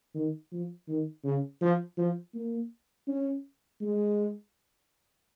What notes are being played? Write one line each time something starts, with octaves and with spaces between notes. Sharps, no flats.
D#3
F3
D#3
C#3
F3
F3
A#3
C#4
G#3